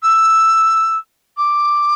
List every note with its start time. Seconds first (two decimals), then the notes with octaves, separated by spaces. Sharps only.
0.02 E6
1.37 D6